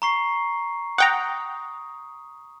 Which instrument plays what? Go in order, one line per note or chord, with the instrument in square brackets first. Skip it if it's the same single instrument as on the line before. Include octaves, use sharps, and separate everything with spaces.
[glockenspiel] A#5 C#6 C7
[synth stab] F#5 G5 A#5 [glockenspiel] D#6